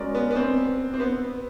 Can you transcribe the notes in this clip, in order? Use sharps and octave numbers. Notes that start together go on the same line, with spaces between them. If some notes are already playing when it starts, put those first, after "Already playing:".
Already playing: G#3 C#4 F#4 A#4 D5
B3
B3
C4
C4
B3